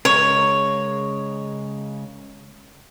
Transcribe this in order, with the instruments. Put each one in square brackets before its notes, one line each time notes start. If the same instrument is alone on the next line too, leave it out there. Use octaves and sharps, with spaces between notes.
[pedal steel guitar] C#3 G#3 A#4 [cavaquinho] C#5